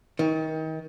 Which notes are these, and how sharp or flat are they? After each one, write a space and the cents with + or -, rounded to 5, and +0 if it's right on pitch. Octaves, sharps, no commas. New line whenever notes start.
D#3 +30